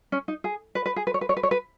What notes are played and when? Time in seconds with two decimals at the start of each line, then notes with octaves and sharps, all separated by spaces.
0.12 C#4
0.28 D#4
0.44 G#4
0.75 B4
0.86 B4
0.96 G#4
1.07 B4
1.14 C#5
1.21 B4
1.29 C#5
1.37 B4
1.43 C#5
1.51 B4